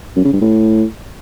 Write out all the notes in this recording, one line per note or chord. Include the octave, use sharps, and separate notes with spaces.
F#2
C#3
G2
A2